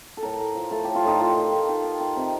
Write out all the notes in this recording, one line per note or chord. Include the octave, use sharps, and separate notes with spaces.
A4
A2 A#4
A2
F3
A3 A4
A2 G4
F4
A2 D#4
D#3 F4
D#3
D#3
D#3
D#3
D#3
C3